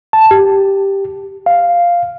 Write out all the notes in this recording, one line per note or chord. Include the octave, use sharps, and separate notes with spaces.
A5
G4
F5